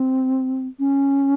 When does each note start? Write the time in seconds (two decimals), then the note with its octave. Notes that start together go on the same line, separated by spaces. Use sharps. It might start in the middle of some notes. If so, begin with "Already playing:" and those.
Already playing: C4
0.79 C#4